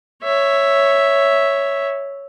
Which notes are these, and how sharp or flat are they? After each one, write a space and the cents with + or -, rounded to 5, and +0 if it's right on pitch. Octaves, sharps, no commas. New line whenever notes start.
C#5 +0 E5 +0